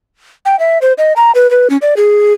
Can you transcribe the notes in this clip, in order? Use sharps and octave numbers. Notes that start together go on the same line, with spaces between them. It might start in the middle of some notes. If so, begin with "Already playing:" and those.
G5
E5
C5
D#5
A#5
B4
B4
C#4
D5
G#4